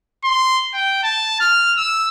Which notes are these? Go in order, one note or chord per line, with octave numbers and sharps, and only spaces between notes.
C6
G5
A5
F6
E6